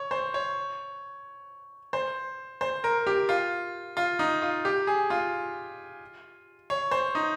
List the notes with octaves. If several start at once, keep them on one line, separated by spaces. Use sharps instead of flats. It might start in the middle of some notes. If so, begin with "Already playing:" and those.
Already playing: C#5
C5
C#5
C5
C5
A#4
G4
F4
F4
D#4
F4
G4
G#4
F4
C#5
C5
D#4